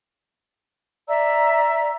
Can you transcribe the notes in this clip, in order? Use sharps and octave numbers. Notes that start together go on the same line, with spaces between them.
D5 E5 A#5 E6